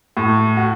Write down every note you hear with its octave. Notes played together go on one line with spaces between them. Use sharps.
A2
F#4